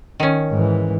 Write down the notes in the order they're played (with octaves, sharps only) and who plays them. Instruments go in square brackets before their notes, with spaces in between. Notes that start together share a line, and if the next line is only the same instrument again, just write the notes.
[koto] D#3 C#4
[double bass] G#2 E3